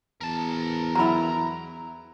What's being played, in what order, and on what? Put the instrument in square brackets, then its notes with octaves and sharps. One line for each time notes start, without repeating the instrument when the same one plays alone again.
[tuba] E2 [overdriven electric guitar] A#4 A5
[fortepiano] F#3 E4 [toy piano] A#5 B5